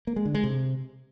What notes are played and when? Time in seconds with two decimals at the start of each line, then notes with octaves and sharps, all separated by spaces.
0.07 A#3
0.16 G#3
0.25 D3
0.35 G#3
0.44 C3